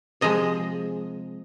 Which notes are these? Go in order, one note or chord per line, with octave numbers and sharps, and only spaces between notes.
C3 F3 G#3 D#5